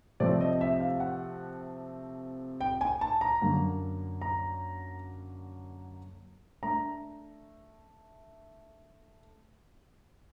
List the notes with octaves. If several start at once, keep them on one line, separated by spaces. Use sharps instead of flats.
C3 F3 A3 C4 D5
D#5
E5
F5
F#5
G5
G#5
A5
A#5
F#2 D3 F#3 A#3
A#5
A3 D4 A#5